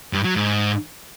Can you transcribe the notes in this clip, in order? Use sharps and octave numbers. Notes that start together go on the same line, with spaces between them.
G2
F#3
G#2